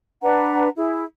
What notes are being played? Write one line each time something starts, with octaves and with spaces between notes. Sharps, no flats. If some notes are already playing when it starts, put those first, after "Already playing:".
D4 B4 F#5 A#5
E4 G#4